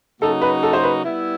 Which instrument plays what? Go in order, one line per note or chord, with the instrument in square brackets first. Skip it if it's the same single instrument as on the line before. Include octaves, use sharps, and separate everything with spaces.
[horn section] C#3 F#3 A#3 D#4 F#4 [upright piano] A4
[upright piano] B4
A4
C5
B4
[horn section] G3 B3 E4